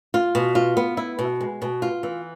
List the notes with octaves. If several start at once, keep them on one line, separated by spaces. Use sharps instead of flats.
F4
B2
F4
B3
E4
B2
G#3
B2
F4
E3